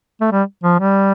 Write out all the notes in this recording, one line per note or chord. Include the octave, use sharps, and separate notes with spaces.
A3
G3
F3
G3